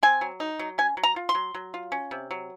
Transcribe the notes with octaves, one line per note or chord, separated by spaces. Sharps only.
C4 G#5
F#3
D#4
F#3
C#4 G#5
F#3
A#5
F4
C6
F#3
F#3
F4
C#4
C3
F#3